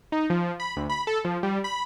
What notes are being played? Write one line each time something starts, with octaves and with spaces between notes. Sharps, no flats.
D#4
F3
B5
D2
B5
A4
F3
G3
B5